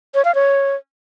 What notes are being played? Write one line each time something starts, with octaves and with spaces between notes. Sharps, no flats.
C#5
F5
C#5